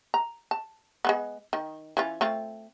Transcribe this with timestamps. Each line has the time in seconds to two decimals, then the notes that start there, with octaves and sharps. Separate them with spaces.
0.14 A#5
0.51 A5
1.05 G#3 A#3 B3
1.53 D#3
1.97 E3 C#4 F4
2.21 A3 C4 F4